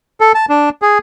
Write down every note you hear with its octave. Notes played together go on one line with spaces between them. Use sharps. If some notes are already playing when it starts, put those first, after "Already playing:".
A4
A5
D4
G#4